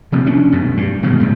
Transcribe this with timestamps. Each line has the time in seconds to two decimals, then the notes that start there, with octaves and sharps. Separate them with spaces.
0.12 C3 F3 A#3
0.26 C#4 D4
0.52 B1 F#2 B2
0.77 G2
1.03 B2 D#3 G#3
1.20 C2 A2 C3